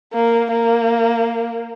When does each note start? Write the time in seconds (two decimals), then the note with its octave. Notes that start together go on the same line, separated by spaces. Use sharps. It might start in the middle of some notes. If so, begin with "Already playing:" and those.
0.13 A#3
0.51 A#3